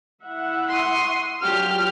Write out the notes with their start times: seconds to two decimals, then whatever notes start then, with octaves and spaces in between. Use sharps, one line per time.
0.25 E4 E5 F#5
0.68 C6 C#6 D#6
1.43 F#3 D4 F4 G4 F6